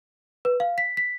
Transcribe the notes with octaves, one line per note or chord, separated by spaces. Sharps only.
B4
F5
B6
B6